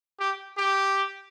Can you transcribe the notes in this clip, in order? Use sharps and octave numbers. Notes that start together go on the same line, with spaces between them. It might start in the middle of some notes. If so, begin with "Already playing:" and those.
G4
G4